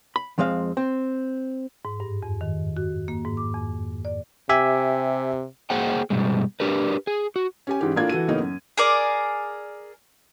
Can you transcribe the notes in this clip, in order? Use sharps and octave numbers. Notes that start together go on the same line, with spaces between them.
B5
F2 F3 G#3 C4 F5
C4
G#2
G2
F2
D#3
F#4
A#3
G#2
D6
F2
D5
C3 G4 E5 G#5
A#3 G#4 C5 F#5 G5
G2 B2 G3 G#3
D4 G4 A#4 B4
G#4
F#4
C#4 G4 G#5
G#2 E3 C#4 G4
A2 A#3 D4 F4 G#6
E3 F#4 A4 D#7
A2 C#3 A#3 B3 C#4 D#4
F#2
G#4 A#4 D5